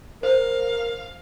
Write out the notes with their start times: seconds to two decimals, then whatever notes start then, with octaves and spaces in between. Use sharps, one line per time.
0.23 A#4 C5 F5